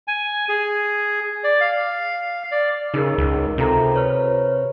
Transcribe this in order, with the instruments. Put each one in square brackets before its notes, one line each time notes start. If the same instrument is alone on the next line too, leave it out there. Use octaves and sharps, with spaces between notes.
[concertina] G#5
G#4
D5
F5
D5
[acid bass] C#3 [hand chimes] D#4 G#4 A#4
[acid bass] C#2
[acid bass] C3 [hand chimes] F4 A4 A#5
[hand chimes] B4 C#5 F6